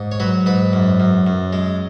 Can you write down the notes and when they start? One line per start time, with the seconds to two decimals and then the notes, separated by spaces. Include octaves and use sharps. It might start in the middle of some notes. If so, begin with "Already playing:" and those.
Already playing: G#2
0.11 C#5
0.20 F#3 B4
0.46 G#2 B4
0.73 F#2
1.00 F#2
1.26 F#2
1.53 G#3